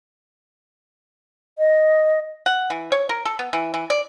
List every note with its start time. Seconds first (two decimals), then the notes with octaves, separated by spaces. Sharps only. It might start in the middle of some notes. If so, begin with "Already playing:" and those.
1.59 D#5
2.46 F#5
2.70 E3
2.92 C#5
3.09 A#4
3.25 A4
3.39 B3
3.53 E3
3.74 E3
3.90 D5